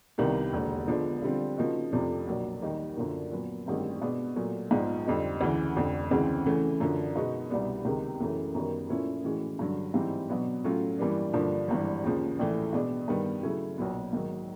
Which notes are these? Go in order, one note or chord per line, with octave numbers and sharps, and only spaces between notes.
C2 C3 D#3 G3 B3
E1 D#2 D3
D3 F3 G#3 B3 D4
D3 G3 C4 F4
C#3 F3 A#3 D#4 F#4
F2 C3 F3 A3 D4
B1 A#2 F#3 A#3 D4
D#2 D#3 G3 A#3 D#4
F#2 D3 F3 A#3
A#2 F#3 B3
A1 G2 D#3 G#3 C4
B2 G#3 B3 D4
A#2 F#3 A3
A#1 G#2 F3 G#3 B3
F2 D3 G3 C4 D#4
D2 C#3 E3
F1 F2 D3
D2 C#3 E3 G#3 C4
C#3 E3 A3 C#4
F#2 D3 F3
B2 G#3 B3 D#4 F#4
C2 B2 G3 B3 D4
C#2 C3 D#3 G#3 B3
F#2 C#3 E3 A3
F#2 D#3 G3 B3
A#2 F3 A3 C#4 E4
A2 E3 G#3 C#4 F#4
G2 D3 F#3
G#2 E3 G3 C4
B2 F#3 B3 D4
A2 F#3 A3 C#4 F4
G2 E3 G3 A#3 D4
G2 D3 F3 A#3 D4
G#1 G2 E3
D#2 C#3 F3
A#1 A2 E3 A3
B2 G#3 B3 D4
G2 D#3 G3 B3
C#3 F#3 A3 C#4 E4
B1 A#2 F#3 B3
G#2 D#3 F#3 A#3